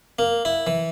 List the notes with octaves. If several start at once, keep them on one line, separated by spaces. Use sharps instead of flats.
A#3
E4
E3